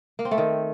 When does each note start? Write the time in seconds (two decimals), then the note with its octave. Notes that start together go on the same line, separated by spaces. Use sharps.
0.19 A#3
0.25 C4
0.31 A3
0.38 D#3